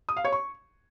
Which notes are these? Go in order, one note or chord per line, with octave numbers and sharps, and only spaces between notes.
D#6
F5
C#5
C#6